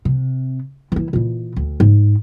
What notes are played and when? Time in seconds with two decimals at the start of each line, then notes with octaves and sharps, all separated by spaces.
0.05 C3
0.92 E3 E4
1.13 A#2 E3
1.56 D2
1.80 G#2